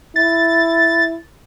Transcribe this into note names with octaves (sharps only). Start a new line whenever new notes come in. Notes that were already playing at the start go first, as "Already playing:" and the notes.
E4 A6